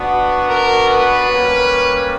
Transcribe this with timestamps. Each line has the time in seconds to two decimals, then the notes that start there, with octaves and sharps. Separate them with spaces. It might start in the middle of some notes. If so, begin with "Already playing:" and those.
Already playing: B3 D4 F#4
0.48 A#4
0.89 B4
1.30 G3 A#3 C#4